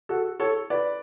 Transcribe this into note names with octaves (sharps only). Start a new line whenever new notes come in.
F#4 A4
A4 C#5
B4 D5